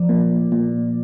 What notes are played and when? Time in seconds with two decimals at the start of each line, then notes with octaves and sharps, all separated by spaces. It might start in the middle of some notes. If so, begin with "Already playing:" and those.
Already playing: F3 D5
0.09 A#2
0.52 A#2